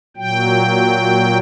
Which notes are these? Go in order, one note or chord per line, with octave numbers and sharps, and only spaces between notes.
A#2 F#3 G5